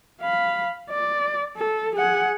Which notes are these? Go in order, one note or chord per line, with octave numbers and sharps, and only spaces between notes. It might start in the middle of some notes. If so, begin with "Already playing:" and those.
F5 B5
D5
A4
G#4 F#5